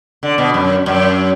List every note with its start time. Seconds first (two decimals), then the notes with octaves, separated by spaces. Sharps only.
0.23 D3
0.38 B2
0.54 F#2
0.86 F#2